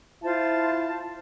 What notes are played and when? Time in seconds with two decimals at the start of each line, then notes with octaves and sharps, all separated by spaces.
0.23 E4 F4 C5 A5